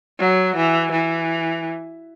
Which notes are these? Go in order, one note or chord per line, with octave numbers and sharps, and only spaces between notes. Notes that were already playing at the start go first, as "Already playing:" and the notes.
F#3
E3
E3